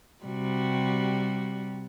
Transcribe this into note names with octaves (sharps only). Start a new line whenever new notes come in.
C3 G3 F#4